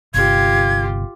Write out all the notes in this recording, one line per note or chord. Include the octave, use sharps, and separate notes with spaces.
G1 C3 F4 G4 G#6